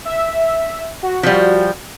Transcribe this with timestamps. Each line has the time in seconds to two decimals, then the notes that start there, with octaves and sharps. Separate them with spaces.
0.05 E5
1.03 F#4
1.23 F3 G3